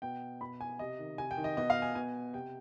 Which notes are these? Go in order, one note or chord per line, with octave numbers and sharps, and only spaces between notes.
B2 G5
B2 B5
G#5
C3 D#5
D#3
C3 G#5
G5
D#3
D#5
B2 D#5
F5
G#5
B2 G#5
C3 G5